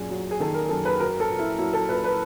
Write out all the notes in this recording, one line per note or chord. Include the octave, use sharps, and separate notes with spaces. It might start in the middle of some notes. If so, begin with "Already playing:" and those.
Already playing: F#2 A#2 G#4
F#3
G#4
D#3 A4
A#4
F#2 A4
B4
F#3 A#4
A4
A#2
E4
F#3 E4
A4
A#2 B4
B4